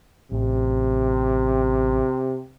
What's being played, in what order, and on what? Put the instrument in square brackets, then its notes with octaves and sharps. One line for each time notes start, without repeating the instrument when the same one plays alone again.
[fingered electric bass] A1 [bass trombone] C3